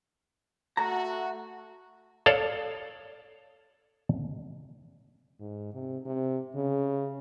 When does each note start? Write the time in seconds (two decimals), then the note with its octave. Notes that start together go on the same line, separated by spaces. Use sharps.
0.77 A3 F#4 A#5
2.26 A4 C#5 D5 F5 A5
5.40 G#2
5.74 C3
6.06 C3
6.55 C#3